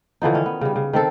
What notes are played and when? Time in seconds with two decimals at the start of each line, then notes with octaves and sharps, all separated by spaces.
0.22 D3 E3 F3 D#4
0.34 D#3 C#4
0.46 B3
0.61 C#3 G3
0.76 C#3
0.93 D#3 C4 A4